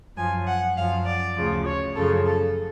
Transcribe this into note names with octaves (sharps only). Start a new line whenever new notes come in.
F#2 F3 G#5
F#5
F#2 F3 F5
D5
D2 C#3 F3
C#5
F#2 C#3 F3 A4
A4